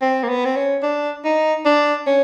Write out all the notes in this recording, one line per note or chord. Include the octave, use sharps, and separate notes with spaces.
C4
A#3
B3
C4
C#4
D4
D#4
D4
C#4